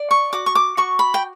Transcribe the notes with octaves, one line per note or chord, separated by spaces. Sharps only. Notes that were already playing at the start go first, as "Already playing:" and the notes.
Already playing: D5
C#6
F#4 D6
C#6
D6
F#4 C#6
B5
G5